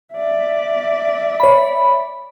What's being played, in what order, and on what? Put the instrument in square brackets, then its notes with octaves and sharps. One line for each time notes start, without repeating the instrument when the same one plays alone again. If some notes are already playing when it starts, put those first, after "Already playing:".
[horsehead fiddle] D5 E5
[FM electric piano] C#5 B5